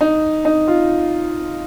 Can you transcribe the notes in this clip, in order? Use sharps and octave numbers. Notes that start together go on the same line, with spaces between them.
D#4
D#4
F4